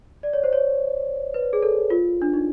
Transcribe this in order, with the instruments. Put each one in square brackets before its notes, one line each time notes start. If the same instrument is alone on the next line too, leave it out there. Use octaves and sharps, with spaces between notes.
[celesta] D5
C#5
C5
C#5
B4
G#4
A4
F4
D4
D#4